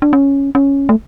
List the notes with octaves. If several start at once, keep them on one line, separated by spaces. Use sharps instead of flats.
D4
C#4
C#4
A3